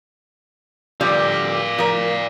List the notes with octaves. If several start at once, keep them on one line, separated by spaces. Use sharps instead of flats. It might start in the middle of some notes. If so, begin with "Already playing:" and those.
D3 F3 G3 D5 F5
F3 A#4